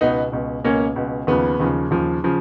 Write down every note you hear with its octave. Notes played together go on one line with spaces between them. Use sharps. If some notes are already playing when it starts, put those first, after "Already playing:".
C#2 B2 B3 D#4
C#2 B2
C#2 B2 A#3 C#4
C#2 B2
D#2 C#3 F3 B3
D#2 C#3 F3
D#2 C#3 F3
C#3 F3